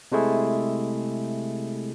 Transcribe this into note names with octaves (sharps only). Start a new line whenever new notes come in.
C3 G#3 A3 E4 G#4